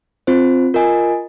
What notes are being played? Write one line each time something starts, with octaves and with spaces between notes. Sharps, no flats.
C4 F4 C5
F4 A#4 D#5 G#5